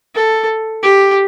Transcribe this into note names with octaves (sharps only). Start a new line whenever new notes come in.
A4
G4